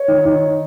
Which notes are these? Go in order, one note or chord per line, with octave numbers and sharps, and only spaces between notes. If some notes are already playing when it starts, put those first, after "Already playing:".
Already playing: C#5
D#3
D#3